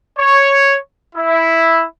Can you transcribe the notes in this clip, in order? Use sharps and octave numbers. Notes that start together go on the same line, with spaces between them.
C#5
E4